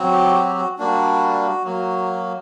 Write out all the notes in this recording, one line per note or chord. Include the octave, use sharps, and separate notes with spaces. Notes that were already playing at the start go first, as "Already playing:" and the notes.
Already playing: F#3 C4 F#4
G4
G4
F#4
G3 A#3 D4 F#4
F#3 A#3 F#4